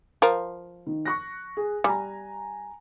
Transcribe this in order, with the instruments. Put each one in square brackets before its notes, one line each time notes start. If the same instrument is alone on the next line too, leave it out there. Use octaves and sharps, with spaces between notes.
[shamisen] F3 A#4
[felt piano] D#3
C#6 F#6 A#6
G#4
[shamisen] G3 [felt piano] G#5 A#5